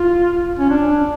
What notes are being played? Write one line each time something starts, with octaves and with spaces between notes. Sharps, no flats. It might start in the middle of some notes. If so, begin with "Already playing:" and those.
Already playing: F4
C#4
D4